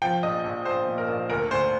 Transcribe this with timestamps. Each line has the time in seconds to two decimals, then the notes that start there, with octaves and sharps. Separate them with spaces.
0.02 F3 G5
0.23 A#1 D#5
0.44 A#1
0.65 A#1 C5
0.87 A#2
0.98 A#4
1.08 A#1
1.30 D2 A#4
1.51 D2 C5